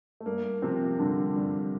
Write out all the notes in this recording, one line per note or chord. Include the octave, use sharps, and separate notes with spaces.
A3
G2 A#3
C3 F3 C4
G2 D3 D4
G2